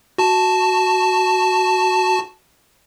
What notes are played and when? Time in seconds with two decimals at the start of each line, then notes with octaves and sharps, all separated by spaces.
0.18 F#4 A5